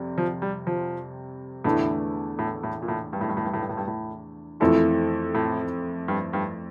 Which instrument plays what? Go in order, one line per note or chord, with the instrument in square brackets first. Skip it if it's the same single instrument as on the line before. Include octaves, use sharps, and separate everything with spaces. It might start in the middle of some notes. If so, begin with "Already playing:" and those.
Already playing: [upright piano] F2 C3 G3
[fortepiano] F3
G3
F3
[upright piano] E2 D3 A3 E4 [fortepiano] A2
[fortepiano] A2
A2
A#2
A2
G2
A2
G2
A2
G2
A2
G2
A2
G2
A2
[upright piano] F2 E3 A3 E4 A4 [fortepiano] A#2
[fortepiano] A2
G2
G2